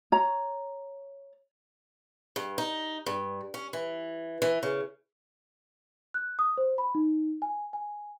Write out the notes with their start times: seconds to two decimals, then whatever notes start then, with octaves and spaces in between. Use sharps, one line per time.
0.12 C#5 A#5
2.36 G2
2.58 D#4
3.06 G2
3.54 C#4
3.73 E3
4.42 E3
4.63 C#3
6.14 F#6
6.39 D#6
6.58 C5
6.78 B5
6.95 D#4
7.42 G#5
7.73 G#5